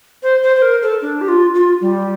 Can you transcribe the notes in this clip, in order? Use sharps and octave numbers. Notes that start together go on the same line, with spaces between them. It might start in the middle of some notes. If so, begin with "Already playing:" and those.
C5
C5
C5
A#4
A4
D4
G4
F4
F4
G3